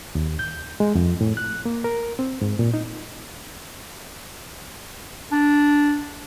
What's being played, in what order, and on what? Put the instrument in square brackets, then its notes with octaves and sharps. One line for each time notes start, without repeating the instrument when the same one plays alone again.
[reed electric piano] D#2
G6
G#3
F2
A2
F#6
A#3
A#4
C4
G#2
A#2
D#4
[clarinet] D4